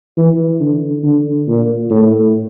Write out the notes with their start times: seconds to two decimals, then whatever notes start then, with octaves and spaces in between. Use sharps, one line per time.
0.17 E3
0.60 D3
1.03 D3
1.48 A#2
1.91 A2